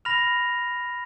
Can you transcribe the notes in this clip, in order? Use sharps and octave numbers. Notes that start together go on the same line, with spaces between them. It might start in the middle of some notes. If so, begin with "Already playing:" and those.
B5 F6 A#6 F7